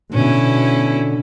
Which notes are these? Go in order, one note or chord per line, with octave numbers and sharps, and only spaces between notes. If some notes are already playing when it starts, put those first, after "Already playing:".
B2 D3 C#4 E4